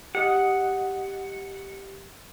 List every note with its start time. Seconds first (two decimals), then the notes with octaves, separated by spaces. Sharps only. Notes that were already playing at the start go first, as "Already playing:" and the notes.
0.15 G4 D#5 F#5 D#6